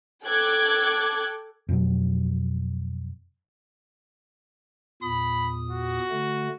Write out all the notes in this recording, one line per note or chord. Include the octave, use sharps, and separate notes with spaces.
A4 G5 D6 F#6 G#6
F2 B2 F#3
E2 A#2 B5 D#6
F#4
D3 A3